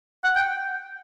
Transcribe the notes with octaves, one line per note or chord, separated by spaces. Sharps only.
F#5
G5